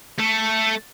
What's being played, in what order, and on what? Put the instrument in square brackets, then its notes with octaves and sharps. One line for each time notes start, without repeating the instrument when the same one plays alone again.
[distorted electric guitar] A3 A4